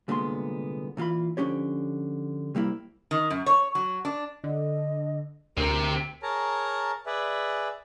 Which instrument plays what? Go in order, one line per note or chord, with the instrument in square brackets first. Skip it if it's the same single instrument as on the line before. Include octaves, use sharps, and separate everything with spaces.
[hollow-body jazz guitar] C2 A#2 D3 G#3 B3 C6
A#2 E3 F4 F5 B5
D3 F3 C#4 G4 C#5
C3 G3 A#3 E4
[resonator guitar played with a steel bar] D#3
F#2
C#5
F#3
D4
[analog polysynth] D3 [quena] D#5
[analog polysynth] D2 [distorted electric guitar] C3 C4 [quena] A#4
[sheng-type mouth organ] G#4 A#4 C#5 A5 A#5
G#4 B4 D5 E5